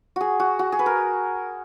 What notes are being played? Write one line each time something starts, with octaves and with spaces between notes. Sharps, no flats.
F#4 G#4
F#4
F#4
G#4
B4
A#4